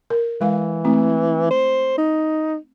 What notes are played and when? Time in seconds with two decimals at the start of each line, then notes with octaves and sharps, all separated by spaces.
0.10 A#4
0.41 E3 G#3 F5
0.85 A3 C4 E4
1.51 C5
1.98 D#4